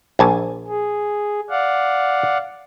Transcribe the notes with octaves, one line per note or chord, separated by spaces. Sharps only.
A#1 G#5 A5
G#4
D5 F5 F#5